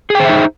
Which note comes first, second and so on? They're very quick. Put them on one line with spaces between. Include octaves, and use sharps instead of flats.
G#4 G5 C5 E5 D#4